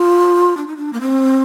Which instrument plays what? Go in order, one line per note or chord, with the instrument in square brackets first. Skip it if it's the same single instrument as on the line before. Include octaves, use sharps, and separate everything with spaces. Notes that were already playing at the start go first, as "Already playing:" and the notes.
Already playing: [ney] F4
D4
D#4
D4
A#3
C4